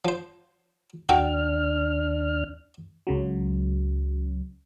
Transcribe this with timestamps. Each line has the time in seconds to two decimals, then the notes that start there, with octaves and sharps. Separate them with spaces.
0.05 F3 C5
1.09 D#2 D4 F#4 A4 G5 F6
3.07 C#2 C#3 F#3